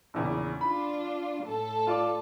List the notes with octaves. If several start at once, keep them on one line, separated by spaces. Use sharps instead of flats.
A#1 E2 C#3
D4 F4 B5
A2 A4
F4 D5 D6